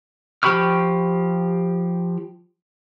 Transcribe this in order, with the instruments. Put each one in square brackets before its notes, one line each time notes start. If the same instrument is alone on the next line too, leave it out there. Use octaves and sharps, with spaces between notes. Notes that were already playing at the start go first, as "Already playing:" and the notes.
[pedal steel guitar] F3 G4 B5 C#6 F6